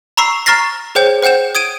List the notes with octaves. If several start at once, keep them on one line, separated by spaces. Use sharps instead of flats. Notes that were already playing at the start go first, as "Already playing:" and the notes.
A#5 B5 C#6 E6 C7
A#5 C#6 F6 A6 A#6 C7
G#4 C5 C#5 G5 G6
C5 F#5 G5 G6 E7
D#6 G#6 D7 D#7